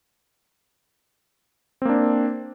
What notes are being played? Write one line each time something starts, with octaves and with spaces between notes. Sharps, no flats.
A#3 C4 D4